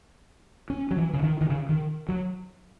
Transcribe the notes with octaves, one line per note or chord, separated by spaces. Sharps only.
C#4
F#3
E3
C#3
D#3
D#3
C#3
D#3
F#3